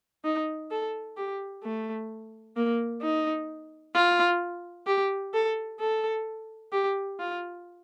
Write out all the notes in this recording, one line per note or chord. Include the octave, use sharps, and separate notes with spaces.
D#4
A4
G4
A3
A#3
D#4
F4
G4
A4
A4
G4
F4